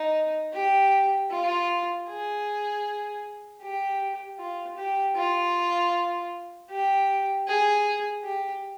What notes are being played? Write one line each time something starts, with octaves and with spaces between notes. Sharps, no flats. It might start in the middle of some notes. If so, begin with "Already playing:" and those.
Already playing: D#4
G4
F4
G#4
G4
F4
G4
F4
G4
G#4
G4